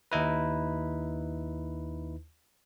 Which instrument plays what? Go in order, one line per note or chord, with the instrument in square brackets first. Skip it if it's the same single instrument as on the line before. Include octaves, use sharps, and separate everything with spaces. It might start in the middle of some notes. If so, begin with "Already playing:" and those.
[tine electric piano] D#2 D#4 E4 B4